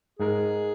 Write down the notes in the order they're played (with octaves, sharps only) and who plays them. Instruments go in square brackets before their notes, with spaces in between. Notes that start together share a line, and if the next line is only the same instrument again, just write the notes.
[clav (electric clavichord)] G#2 G#3 D#4 A#4 [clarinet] G#4